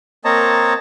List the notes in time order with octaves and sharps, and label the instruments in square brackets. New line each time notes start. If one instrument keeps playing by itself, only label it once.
[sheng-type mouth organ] A#3 C4 C#5 D#5 A5 A#5